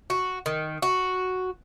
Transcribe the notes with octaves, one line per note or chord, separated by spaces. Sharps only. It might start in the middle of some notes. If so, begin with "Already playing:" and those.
F#4
D#3
F#4